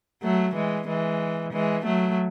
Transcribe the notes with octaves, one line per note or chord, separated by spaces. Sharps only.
F#3 A3
E3 G#3
E3 G#3
E3 G#3
F#3 A3